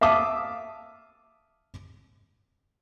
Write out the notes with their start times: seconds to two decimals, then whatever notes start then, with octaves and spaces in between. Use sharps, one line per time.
0.01 E5 F5 A5 D6 D#6